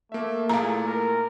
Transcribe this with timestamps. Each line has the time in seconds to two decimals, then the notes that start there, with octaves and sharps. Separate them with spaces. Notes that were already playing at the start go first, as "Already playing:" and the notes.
0.12 A3 A#3 E5
0.49 A#2 A3 E4 G#4 F5 A#5
0.87 A#4